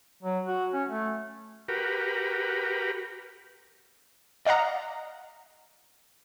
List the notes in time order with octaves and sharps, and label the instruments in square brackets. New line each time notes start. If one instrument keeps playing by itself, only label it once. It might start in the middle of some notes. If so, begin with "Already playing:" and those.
[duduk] F#3
F#4
C#4
A3
[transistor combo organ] F#4 G4 A#4 B4
[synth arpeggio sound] D5 D#5 F5 F#5 A#5